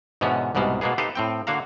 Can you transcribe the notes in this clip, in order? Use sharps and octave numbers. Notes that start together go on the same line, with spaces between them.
G#2 B2 D3 E3 B3 C#4
C2 G#2 B2 G3 G#3
B2 G#3 A#3 B3 G#4
D#4 G4 A4 B4 C5 F5
A2 C4 G5
D3 A#3 F#4 F5 A#5